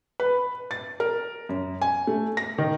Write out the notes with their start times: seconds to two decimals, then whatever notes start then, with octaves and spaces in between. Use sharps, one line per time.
0.20 B4
0.71 A6
1.00 A#4
1.49 F#2
1.82 G#5
2.07 A3
2.37 A#6
2.58 D#3